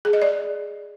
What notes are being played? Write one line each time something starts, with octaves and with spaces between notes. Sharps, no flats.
G#4
D#5
D5